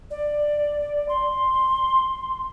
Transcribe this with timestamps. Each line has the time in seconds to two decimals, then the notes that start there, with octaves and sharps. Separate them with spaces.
0.11 D5
1.09 C6